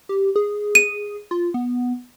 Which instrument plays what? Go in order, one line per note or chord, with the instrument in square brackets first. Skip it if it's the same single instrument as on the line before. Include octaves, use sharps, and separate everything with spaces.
[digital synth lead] G4
G#4
[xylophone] D#7
[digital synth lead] F4
B3